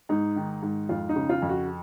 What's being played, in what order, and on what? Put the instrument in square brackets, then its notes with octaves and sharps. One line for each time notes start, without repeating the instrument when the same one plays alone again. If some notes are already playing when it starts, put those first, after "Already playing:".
[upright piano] G#2 D#4
D#3
G#2
F2 F4
D#4
C#3
F4
F2
F#4